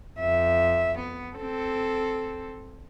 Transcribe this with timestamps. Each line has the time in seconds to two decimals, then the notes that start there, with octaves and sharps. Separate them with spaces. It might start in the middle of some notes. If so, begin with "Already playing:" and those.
0.19 F2 E5
0.98 B3
1.36 C4 A4